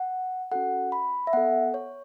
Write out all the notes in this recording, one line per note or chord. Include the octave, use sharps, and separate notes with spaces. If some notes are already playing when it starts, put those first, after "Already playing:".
Already playing: F#5
C#4 F#4 A4 F#5
B5
E5
B3 A4 F#5
C#5